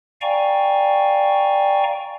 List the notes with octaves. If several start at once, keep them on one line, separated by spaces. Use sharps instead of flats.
D5 F5 G5 G#5 A#5 C#6